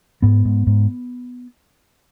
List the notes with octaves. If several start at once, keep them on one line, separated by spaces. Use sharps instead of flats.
G#2 B3
G#2
G#2